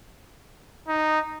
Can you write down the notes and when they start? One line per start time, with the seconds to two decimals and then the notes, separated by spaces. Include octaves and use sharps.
0.88 D#4